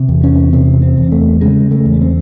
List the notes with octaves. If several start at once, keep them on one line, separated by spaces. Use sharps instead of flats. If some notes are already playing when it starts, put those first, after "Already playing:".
Already playing: C3
E2
C#4
C3 C4
C4
E2
A3
C#3 G#3
A3
E2
C4